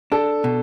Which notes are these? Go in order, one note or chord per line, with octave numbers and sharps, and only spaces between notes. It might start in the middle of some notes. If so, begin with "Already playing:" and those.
D4 A4
B2